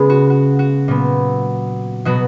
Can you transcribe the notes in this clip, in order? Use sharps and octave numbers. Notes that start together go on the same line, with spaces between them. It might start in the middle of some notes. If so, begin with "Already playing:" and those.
Already playing: C#3 G#3 B3
F#4
F#4
F#4
A#2 F#3 B3
B2 F#3 B3 F#4